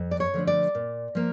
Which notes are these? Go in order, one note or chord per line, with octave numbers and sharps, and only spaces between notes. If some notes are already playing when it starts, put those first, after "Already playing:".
Already playing: F2
D5
C#5
D3 F3 A3 D4
D5
A#2
F3 A#3